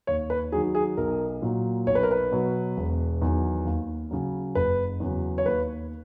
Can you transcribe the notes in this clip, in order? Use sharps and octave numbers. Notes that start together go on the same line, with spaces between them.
D#2 C#5
B4
D#3 F#3 G#4
G#4
B1 A#4
A#2 F#3
B1 C#5
B4
A#4
B4
B2 F#3
E1
E2 D#3 F#3
D#2
C#3 F#3
F#1 B4
E2 C#3 F#3
C#5
D#2 B4